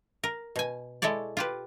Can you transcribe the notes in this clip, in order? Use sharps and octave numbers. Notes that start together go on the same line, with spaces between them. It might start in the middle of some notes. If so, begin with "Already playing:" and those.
A#4
B2 G#5
G#3 E4 A4 C#5 D5
F4 G4 B4